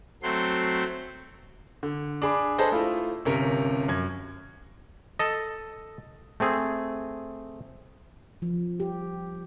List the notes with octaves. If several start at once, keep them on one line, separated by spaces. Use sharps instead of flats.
F#3 A3 C4 C6
D3
D4 G#4 B5 D6
G#4 A4 B4 C5 D#5 A5
A3 E4 F4
G1 C3 C#4 A#4
F#2 G#6
A4 D#5
A3 C4 G#4
F3
G4